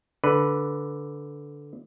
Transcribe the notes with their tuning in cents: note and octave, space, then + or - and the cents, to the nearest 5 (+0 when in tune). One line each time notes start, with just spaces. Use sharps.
D3 -10 B4 +0